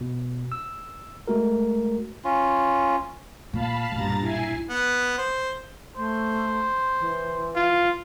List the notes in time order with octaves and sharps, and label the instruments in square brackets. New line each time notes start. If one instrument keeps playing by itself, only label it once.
[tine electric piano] B2
E6
G#3 A3 F#4 A#4
[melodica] C#4 F4
[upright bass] A#2 [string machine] F5 A5 B5
[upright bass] B1 A#2 [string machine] G2 A#5 A6
[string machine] E4 G#5 C7
[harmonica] B3
C5
[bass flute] A3 [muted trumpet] C5
[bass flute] E3
[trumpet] F4